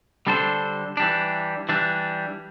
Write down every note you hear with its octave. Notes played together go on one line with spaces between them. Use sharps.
D3 G3 D4 A4 C5
E3 G3 D4
E3 G3 D4